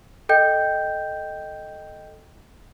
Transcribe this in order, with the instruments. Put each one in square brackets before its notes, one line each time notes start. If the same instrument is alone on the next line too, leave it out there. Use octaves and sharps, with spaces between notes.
[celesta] A4 D#5 G5 G6